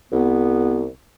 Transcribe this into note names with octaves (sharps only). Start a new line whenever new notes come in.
C2 B3